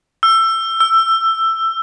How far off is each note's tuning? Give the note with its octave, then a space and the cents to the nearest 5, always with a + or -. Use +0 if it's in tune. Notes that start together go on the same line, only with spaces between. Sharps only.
E6 +20
E6 +10